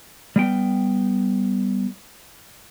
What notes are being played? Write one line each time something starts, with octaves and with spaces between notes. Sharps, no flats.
G3 B3 G5